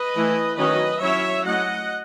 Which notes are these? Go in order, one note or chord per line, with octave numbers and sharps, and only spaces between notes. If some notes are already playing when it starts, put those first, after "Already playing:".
Already playing: B4 D#5
E3 A3 E4
D#3 F#3 C#4 B4 D#5
F#3 C#4 E4 C#5 E5
F#3 A3 C#4 E4 D#5 F#5